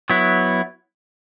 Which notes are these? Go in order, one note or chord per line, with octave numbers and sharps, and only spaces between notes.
F#3 B3 E4